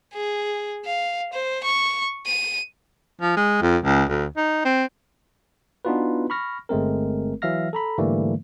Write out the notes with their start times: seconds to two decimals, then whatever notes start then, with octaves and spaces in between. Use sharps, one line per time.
0.13 G#4
0.86 F5
1.33 C5
1.64 C#6
2.26 D#7
3.21 F3
3.37 G#3
3.62 F2
3.85 C#2
4.09 D2
4.37 D#4
4.65 C4
5.85 B3 D4 D#4 F4 F#4 B4
6.30 B5 C#6 F6 A#6
6.69 G1 G#3 A3 C4 A#4
7.42 E3 F#3 E5 F5 F6 A#6
7.73 A4 A#5 B5
7.98 G#2 D3 E3 G3 A3 A#3